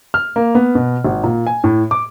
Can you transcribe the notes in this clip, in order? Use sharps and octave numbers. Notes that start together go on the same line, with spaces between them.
F6
A#3
B3
B2
G#1
A#2
G#5
A2
D6